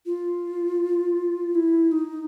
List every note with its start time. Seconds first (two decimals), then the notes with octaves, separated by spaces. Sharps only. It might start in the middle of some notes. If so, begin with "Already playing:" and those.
0.06 F4
1.55 E4
1.92 D#4